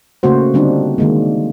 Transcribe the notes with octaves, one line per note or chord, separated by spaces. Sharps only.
C#3 A3 A#3 F#4 C5
D3 G3 C4 D4 D#4
D#3 G#3 A#3